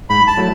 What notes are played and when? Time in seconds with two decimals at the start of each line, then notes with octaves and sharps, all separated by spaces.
0.10 G#2 B5
0.27 A5
0.37 F#3 A3 E4